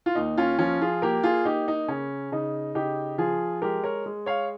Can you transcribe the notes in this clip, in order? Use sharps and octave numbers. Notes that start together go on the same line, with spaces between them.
F4
D#2 D#4
C#4 F4
F3 C#4 F4
F4 G#4
A#3 G4 A#4
F4 G#4
A#3 D#4 G4
D#4
C#3 C#4
C#3 D#4
C#3 D#4 G4
F3 F4 G#4
G#3 G4 A#4
A#4 C#5
G#3
C#5 F5